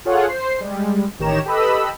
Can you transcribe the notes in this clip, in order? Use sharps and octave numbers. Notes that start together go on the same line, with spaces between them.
F4 G#4 A4 C#5 F#5
C5 C7
G3 G#3
A1 D#3 G4 C#5 A#5 E7
G4 A4 B4 D#5 B5 E6